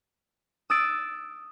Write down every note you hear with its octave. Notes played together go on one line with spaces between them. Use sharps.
D#6 E6 F#6 A6 D7 E7